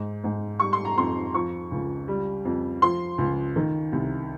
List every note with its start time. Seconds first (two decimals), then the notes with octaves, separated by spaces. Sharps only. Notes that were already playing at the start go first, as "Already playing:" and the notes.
Already playing: G#2
0.24 G#2
0.60 G3 C#6
0.73 C6
0.85 A#5
0.97 F2 C6
1.34 F3 C#6
1.71 C#2
2.08 G3
2.45 F2
2.82 F3 C6
3.18 C#2
3.56 D#3
3.92 C2